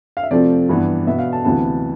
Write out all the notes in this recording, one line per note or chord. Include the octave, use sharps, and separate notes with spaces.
F5
E5
F2 C3 F3 A3 C4 D5
G2 E3 B3
B2 B3 E5
F5
A5
D2 C3 E3 B3 A5